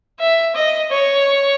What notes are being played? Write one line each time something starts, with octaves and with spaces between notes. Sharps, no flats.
E5
D#5
C#5